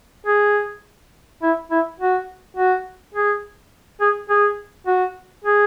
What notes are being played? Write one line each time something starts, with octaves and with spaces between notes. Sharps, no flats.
G#4
E4
E4
F#4
F#4
G#4
G#4
G#4
F#4
G#4